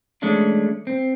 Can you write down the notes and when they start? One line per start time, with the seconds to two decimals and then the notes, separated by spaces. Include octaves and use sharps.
0.22 E3 G#3 A3 C#4 D4
0.87 C4